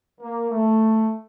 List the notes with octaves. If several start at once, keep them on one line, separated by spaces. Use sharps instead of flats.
A#3
A3